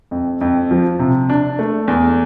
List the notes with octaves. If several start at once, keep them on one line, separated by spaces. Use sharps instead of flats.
F2
F2
F3
C3
D4
A3
E2